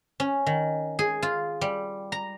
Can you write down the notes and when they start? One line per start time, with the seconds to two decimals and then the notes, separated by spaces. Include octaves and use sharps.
0.20 C#4
0.46 D#3
0.99 G#4
1.22 F4
1.61 G3
2.12 A#5